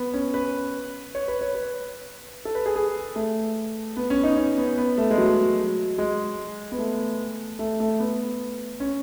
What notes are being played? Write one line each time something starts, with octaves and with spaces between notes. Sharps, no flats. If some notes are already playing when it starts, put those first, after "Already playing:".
Already playing: B3
C#4
B4
C#5
B4
C#5
B4
A4
B4
G#4
G#4
A3
B3
C#4
D#4
C#4
B3
B3
A3
G#3
F#3
G#3
B3
A3
A3
A3
B3
C#4